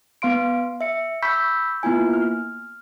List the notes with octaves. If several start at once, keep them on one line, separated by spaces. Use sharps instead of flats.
B3 F5 C6 D7
E5 C#7
B5 C#6 E6 G6 B6
A#3 B3 E4 F4 G#5
F6